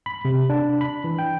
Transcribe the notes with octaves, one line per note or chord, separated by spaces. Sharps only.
B5
C3
D4
B5
E3
G5